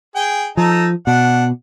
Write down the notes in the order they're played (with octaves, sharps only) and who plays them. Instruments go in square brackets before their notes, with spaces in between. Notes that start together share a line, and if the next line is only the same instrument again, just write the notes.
[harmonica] G#4 G5
[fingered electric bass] F3 [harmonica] D#4 A4
[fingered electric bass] B2 [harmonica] D4 F#5